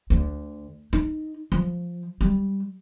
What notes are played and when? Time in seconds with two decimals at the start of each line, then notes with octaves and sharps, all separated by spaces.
0.10 D2
0.93 D#4
1.52 F3
2.21 G3